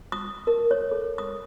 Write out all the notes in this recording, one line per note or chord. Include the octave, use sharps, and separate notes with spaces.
D#6
A#4
C#5
A4
D#6